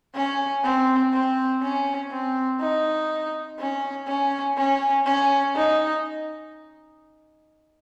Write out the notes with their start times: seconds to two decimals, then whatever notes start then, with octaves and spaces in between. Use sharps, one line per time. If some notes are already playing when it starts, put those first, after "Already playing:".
0.15 C#4
0.63 C4
1.13 C4
1.62 C#4
2.11 C4
2.61 D#4
3.59 C#4
4.08 C#4
4.57 C#4
5.06 C#4
5.56 D#4